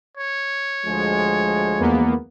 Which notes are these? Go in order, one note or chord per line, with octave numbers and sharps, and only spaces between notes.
C#5
D2 F3 G#3
E2 A#3 B3